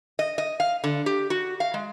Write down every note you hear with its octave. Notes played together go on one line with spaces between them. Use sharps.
D#5
D#5
F5
D3
G4
F#4
F5
G#3